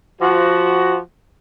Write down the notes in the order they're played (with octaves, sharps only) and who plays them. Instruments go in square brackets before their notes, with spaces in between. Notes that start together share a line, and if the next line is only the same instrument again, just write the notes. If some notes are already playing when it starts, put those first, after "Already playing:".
[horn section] F3 F#4